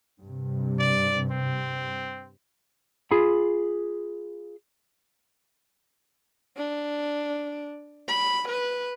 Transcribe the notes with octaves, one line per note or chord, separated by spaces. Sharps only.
G2 C3
D5
C4
F4 G#4 B5
D4
B5
B4